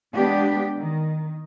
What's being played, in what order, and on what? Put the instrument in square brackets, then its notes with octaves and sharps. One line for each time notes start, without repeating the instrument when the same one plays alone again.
[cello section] G#3 B3 D4 G4
D#3